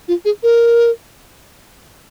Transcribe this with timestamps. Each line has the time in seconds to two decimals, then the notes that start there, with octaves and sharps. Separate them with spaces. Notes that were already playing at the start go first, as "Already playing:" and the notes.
0.08 F4
0.25 G#4
0.43 A#4